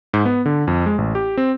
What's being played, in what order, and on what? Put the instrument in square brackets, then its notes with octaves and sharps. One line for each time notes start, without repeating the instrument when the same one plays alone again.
[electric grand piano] G#2
B3
D3
F2
G#3
A1
G4
C4